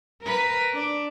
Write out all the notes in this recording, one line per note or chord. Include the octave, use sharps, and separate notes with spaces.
A#4 B4
D4